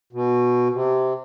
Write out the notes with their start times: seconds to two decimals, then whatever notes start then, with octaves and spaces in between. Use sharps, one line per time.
0.13 B2
0.72 C3